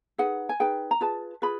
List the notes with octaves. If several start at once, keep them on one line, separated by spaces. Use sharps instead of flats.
D#4 G#4 B4 F#5
G#5
D#4 G#4 B4 G5
A#5
F4 G#4 B4 A5
F4 G#4 B4 B5